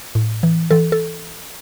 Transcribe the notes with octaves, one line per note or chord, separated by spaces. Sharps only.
A2
E3
E3 A4
A4